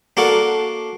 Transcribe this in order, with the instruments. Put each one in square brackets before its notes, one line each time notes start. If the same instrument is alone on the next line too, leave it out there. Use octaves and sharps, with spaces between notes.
[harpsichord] A#3 D4 F#4 A4 A#4